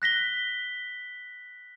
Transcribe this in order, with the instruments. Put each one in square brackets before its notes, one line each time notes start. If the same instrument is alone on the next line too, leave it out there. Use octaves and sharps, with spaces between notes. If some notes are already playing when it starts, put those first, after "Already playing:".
[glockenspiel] F#6 A#6 B6 G7